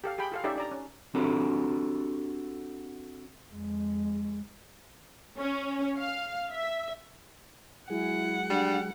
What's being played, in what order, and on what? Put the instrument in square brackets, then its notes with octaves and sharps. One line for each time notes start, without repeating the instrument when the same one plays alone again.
[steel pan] G4 A4 F5
G4 G#4 G5 B5
F4 A4 F5
C#4 D#4 G4 A4 D5 E5
D4 D5 A#5
C#4
[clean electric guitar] C4 D4 F#4 G4 A4
[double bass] F2 G#3
[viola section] C#4
F5
E5
[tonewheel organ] F#3 G#3 G#4 [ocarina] E4 [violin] F#5
[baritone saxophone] G3 [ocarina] D4